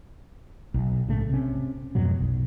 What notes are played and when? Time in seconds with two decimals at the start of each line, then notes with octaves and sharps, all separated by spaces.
0.74 B1
1.08 A#1 G#2 C#3 A3
1.29 C3 C#4
1.95 F2 G#2 B2 F#3
2.20 B1